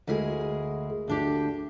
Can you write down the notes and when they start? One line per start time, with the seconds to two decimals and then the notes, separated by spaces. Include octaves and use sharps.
0.07 D2 G#3 E4 G#4 A#4 G#5
1.08 D2 D4 G4